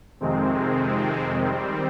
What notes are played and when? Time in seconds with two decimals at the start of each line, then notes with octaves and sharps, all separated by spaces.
0.20 F2 C3 D#3 G#3 C4
1.39 D#3 G3 C4